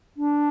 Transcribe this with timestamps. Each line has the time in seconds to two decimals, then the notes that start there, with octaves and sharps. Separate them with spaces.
0.17 D4